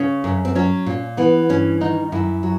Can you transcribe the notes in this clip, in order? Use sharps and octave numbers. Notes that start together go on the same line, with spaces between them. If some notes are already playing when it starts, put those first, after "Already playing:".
Already playing: C#3 C#4
F#2
C4
F#3 C#4
A#2
E3 B3
G2 C#4
D#3 D#4
F#2 E4
F#3